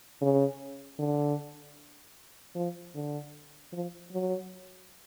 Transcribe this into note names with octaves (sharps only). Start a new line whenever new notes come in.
C#3
D3
F3
D3
F3
F#3